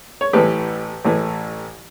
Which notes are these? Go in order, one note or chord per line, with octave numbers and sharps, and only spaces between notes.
C#5
A1 A2 E3 G4 B4
A1 A2 E3